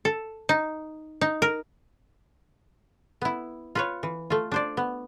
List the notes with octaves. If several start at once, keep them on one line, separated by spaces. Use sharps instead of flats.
A4
D#4
D#4
A#4
B3 E4
F4 B4 C#5
E3
A3 F4
D4 C5 D5
B3